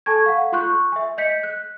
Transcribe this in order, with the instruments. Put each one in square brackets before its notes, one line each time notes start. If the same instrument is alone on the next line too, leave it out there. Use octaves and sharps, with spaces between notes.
[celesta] A4 G#5 A5 C#6 G#6
F5 F#5
F4 C6 C#6 F#6 G6
E5 G#5
D#5 G6 B6 C#7
F#6